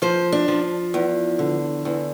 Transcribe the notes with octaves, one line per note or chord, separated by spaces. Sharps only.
F3 C5
D4
F3
E2
D3
E2